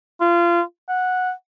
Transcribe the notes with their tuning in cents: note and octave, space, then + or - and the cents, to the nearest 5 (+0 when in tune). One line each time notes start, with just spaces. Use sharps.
F4 -25
F#5 -10